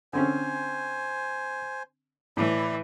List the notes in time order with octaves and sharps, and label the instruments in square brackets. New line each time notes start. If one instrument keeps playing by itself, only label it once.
[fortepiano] D3 C4 C#4 [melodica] C5 G#5
[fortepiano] A2 [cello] E3 [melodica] E4 D5